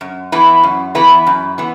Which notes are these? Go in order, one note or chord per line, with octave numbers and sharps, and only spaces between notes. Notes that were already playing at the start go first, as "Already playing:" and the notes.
F#2
E3 B3 E4 B4
F#2
E3 B3 E4 B4
F#2
E3 B3